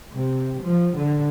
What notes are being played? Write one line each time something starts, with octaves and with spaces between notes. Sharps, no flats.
C3
F3
D3